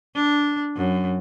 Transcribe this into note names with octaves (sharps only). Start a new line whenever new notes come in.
D4
F#2